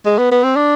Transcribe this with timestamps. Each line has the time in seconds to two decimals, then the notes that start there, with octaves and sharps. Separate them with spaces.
0.06 G#3
0.18 B3
0.32 B3
0.43 C4
0.56 D4